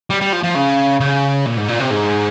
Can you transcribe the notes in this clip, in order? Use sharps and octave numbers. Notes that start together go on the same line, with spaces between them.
G3
G3
F3
F3
C#3
C#3
A#2
G#2
A#2
C3
G#2